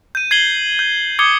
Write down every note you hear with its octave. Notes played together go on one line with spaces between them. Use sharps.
G6 D#7
G#6 C7 F#7 G7
G6
D6 D#6 G#6 C#7 G7